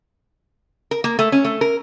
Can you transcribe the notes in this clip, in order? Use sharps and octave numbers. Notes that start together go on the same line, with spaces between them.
A#4
A#3
A3
C#4
A3
A#4